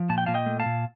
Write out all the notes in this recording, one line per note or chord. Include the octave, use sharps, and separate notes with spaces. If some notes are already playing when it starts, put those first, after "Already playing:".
Already playing: F3
A#2 A5
G5
A#2 F5 A5
D#5 G5
A3
F5 A5
A#2